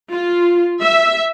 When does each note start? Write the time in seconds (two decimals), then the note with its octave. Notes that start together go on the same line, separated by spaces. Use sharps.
0.12 F4
0.81 E5